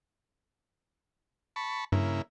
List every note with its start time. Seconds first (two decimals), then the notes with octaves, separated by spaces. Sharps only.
1.56 A5 B5 C#6
1.92 G2 C#3 A#3 E4